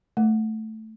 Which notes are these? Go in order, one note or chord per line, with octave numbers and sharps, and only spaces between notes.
A3